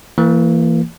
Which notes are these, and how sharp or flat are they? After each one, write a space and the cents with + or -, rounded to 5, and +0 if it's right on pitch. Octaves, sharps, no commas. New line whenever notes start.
E3 +20 A#3 -20